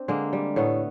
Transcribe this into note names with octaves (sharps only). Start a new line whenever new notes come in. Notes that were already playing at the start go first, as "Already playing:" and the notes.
Already playing: C4 D4
D3 G#3 A#3
G3
A2 A3 B3